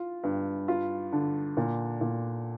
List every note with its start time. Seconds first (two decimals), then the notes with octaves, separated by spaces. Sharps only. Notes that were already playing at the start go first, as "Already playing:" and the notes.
Already playing: F4
0.24 G2
0.68 F4
1.12 D3
1.57 A#2
2.01 A#2